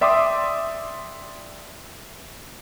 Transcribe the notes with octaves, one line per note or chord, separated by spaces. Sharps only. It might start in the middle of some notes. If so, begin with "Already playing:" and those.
D5 E5 G5 C6 D6 D#6